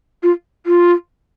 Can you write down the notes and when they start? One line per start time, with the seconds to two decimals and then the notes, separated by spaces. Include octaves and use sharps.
0.23 F4
0.66 F4